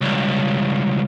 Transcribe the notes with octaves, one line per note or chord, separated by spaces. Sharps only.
C#2 G2